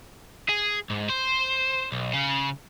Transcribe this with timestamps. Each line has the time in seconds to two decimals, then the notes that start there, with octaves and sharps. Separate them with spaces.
0.49 G#4
0.90 G#2
1.09 C5
1.92 B1
2.14 C#3